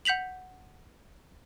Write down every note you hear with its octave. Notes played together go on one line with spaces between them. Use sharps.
F#5 G6 B6 F7 F#7